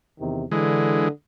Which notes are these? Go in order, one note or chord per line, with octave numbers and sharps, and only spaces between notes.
E2 C3 D#3
D3 E3 G#3